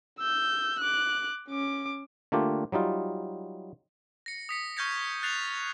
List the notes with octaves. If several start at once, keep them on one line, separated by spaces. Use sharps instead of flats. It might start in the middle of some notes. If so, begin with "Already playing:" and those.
E6 G6
D6 F#6
C#4 D6
D3 A3 A#3 D4 F4 G4
F#3 G3 D#4 F4
A#6 C#7
D#6 B6 C#7
C#6 F6 G6 G#6 A#6 C#7
F#6 A6 C7 F7